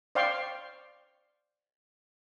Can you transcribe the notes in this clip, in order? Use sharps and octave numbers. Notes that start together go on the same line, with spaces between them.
C5 D5 F5 G5 C6 C#6